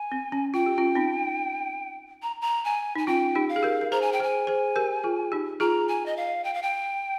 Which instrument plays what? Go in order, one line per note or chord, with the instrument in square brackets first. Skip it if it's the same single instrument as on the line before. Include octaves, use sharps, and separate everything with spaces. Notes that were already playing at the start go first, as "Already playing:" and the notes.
Already playing: [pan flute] G#5
[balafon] C4
C#4
[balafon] F4 [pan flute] G5
[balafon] G4
C#4 F4
C4 D#4
[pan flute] A#5
A#5
G#5
[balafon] D#4 [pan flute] G#5
[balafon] C#4 F4 [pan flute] G5
[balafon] D#4 G4
[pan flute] F5
[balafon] G#4
G4 A#4
A#4
[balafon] G#4 C5 [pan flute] A#5
[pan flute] G#5
G5
[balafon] G#4 C5 [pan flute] G#5
[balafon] G#4 C5
G4 A#4
F4 G#4
D#4 G4
[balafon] F4 G#4 [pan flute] A#5
[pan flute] G#5
D#5
F5
G5
F5
G5